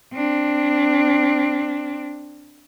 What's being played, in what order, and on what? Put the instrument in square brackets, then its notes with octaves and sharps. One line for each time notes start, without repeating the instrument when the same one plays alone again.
[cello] C4 D4